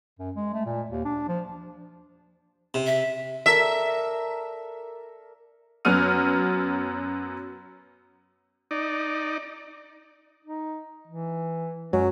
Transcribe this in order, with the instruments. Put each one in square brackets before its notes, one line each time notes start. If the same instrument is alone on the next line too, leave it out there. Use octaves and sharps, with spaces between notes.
[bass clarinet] F#2
G#3
A3
A#2
D#2
D4
F3
[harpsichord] C3
[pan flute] E5
[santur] A4 A#4 D5 [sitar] E5
[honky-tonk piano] F#2 F#3 B3 F#4 F6 D#7
[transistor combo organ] D#4 D5
[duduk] D#4
E3
[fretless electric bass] F#2 G#3 [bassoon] F#3 [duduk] C#4